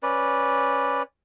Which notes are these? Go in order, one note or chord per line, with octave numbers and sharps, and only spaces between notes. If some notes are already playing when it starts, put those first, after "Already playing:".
C#4 B4 D5